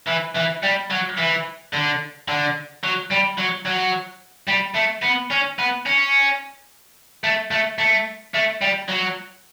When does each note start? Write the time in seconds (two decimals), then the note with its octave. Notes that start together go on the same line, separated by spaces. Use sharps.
0.08 E3
0.36 E3
0.63 G3
0.91 F#3
1.18 E3
1.74 D3
2.28 D3
2.84 F#3
3.11 G3
3.39 F#3
3.66 F#3
4.49 G3
4.76 A3
5.03 B3
5.31 C#4
5.59 B3
5.86 C#4
7.24 A3
7.51 A3
7.79 A3
8.34 A3
8.61 G3
8.89 F#3